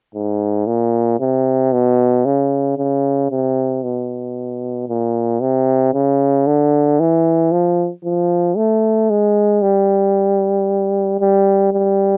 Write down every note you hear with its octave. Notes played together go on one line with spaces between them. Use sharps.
G#2
A#2
C3
B2
C#3
C#3
C3
B2
A#2
C3
C#3
D3
E3
F3
F3
A3
G#3
G3
G3
G3